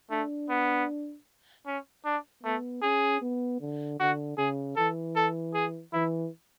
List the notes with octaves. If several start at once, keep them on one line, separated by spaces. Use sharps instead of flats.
A3 D4
B3
C#4
D4
A3 B3
C#4 G#4
B3
D3
D3 F#4
C#3 G#4
E3 A4
A4
G#4
E3 E4